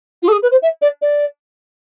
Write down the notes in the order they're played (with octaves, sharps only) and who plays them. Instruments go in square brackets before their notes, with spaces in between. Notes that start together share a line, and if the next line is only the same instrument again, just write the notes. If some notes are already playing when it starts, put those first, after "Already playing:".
[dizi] F4
A4
G#4
B4
C5
E5
D5
D5